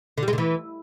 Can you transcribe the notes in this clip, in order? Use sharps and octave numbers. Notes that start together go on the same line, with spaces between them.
D3
G3
G#3
D3
E3